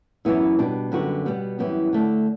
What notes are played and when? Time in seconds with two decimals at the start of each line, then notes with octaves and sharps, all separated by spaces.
0.25 F#2 E3 B3 E4
0.59 B2 G3 D4
0.92 F#2 D3 G3 B3 F#4
1.26 B2 G3 B3
1.59 F#2 E3 G3 B3
1.93 D3 A3 D4